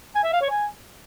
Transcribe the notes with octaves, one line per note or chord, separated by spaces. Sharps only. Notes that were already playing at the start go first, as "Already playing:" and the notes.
G#5
E5
F5
C#5
G#5